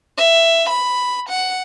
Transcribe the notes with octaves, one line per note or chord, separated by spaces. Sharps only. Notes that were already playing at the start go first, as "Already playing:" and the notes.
E5
B5
F#5